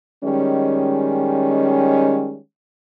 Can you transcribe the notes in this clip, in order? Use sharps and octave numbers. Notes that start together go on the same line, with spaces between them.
D#3 G3 G#3 C#4